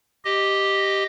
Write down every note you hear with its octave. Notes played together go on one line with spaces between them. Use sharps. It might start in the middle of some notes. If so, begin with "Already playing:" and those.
G4 D#5